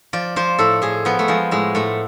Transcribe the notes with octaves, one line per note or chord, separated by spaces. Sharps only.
F3 D5
F3 C5
A2 A4
A2 G#4
F3 B3
A3
F3 G#3
A2 G#3
A2 A3